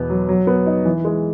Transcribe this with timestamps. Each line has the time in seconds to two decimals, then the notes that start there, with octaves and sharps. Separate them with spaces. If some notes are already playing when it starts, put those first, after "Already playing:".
Already playing: E2 B2 B3
0.10 F#3
0.29 F#3
0.47 B3
0.66 D#4
0.85 E3
1.05 G#3